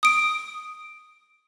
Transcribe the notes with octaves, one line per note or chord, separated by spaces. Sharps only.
D#6 D7